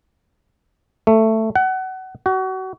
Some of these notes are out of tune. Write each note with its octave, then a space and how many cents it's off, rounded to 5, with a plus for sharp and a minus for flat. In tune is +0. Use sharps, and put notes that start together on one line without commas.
A3 +10
F#5 +25
F#4 +30